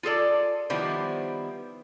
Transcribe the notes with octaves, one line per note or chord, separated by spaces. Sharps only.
F4 G#4 A4 D5
D#3 F3 G3 B3 E4 C5